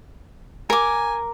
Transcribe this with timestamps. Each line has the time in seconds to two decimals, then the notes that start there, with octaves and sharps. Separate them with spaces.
0.70 A#4 G#5 D6